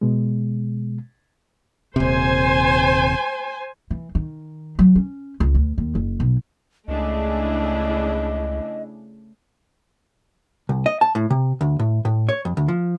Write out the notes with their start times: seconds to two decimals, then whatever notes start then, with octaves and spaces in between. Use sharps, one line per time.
0.01 B2 G#3
1.96 D#1 C3 C5 G#5
3.91 E3
4.15 D#3
4.79 F#3
4.96 C#4
5.40 C#2
5.55 D2
5.78 D#2
5.95 F#1
6.20 B1
6.88 C#2 C#3 A3 D4 E4 G#4 D#5
10.69 C2
10.86 D#5
11.01 A5
11.15 A2
11.30 C3
11.61 D2
11.79 A2
12.05 A2
12.29 C#5
12.45 F2
12.57 D2
12.68 F3